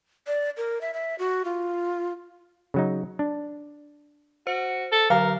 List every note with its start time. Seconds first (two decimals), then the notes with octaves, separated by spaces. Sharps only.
0.27 D5
0.57 A#4
0.81 E5
0.94 E5
1.19 F#4
1.45 F4
2.74 C#3 F#3 D#4
3.19 D4
4.47 F#4 C5 C#7
4.92 A4
5.10 D3 F#3 A#4 F5